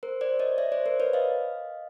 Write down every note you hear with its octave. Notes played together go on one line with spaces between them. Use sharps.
A#4 C5
C5 D5
C#5 D#5
D5 E5
C5 D5
A#4 C5
B4 C#5
D#5 F5